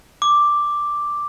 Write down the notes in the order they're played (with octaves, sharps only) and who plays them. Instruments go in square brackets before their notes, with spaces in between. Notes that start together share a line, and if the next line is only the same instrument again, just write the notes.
[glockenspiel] D6